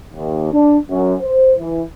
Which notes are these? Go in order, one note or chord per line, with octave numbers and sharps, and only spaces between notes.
D#2
D4
F#2
C5
E3